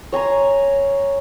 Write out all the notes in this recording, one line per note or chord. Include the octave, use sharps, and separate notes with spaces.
C#5 G#5 A#5 C6